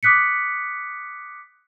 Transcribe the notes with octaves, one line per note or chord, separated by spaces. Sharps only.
D6 D#6 F#6 B6 C#7